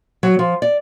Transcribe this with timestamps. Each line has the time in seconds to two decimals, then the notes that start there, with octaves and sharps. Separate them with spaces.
0.23 F#3
0.39 F3
0.62 D5